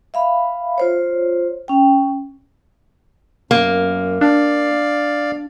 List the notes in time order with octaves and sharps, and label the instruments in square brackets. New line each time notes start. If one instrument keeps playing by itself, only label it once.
[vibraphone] E5 F5 B5
F4 C5 C#5
C#4 G5
[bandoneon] F#2 [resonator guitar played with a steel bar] A#3
[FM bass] D4 [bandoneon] D5 F5